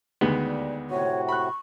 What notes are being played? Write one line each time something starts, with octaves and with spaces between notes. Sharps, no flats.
D2 D#3 G#3 B3
D#2 D5
A2 C3 F#4 C#5
B5 C#6 F#6